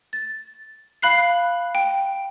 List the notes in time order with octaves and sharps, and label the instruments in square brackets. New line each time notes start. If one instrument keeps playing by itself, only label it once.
[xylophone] A6
F5 B5 F#6 C7
G5